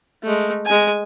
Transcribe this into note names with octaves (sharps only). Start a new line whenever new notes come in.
G#3 A3
G#3 G#5